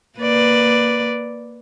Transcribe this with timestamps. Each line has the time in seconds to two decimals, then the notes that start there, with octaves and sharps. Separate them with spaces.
0.19 A#3 B4 D5